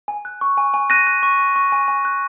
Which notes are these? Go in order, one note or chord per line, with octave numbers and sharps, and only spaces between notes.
G#5
F#6
C#6
G#5
G#5
F#6 A#6 D#7
F#6
C#6
G#5
C#6
G#5
G#5
F#6